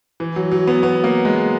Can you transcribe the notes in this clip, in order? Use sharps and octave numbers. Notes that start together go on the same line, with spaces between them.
E3
F#3
F#3
B3
B3
A#3
G#3